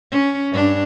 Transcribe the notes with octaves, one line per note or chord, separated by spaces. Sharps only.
C#4
G2 D4